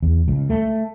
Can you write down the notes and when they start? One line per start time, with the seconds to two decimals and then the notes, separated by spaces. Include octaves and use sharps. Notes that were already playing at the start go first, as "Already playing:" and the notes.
0.03 E2
0.28 C#2
0.50 A3